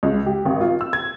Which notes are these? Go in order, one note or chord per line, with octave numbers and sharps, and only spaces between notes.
C#2
G4
G#1
F4
E6
G#6